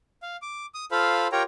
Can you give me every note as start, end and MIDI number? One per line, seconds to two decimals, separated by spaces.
0.23 0.37 77
0.42 0.66 86
0.74 0.85 87
0.91 1.27 65
0.91 1.27 69
0.91 1.27 72
0.91 1.27 77
0.91 1.27 83
1.32 1.43 65
1.32 1.43 67
1.32 1.43 70
1.32 1.43 73
1.32 1.43 79
1.32 1.43 82